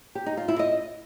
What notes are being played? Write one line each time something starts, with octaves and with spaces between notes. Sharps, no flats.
G4
D#4
F4
E4
D#5